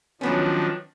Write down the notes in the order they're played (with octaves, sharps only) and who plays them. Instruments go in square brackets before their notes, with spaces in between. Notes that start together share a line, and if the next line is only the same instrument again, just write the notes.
[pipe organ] D#3 F3 D4 [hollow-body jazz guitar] F#3 B3 C#4